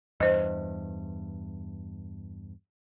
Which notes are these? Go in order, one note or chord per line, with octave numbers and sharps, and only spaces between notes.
E2 G2 C5 D#5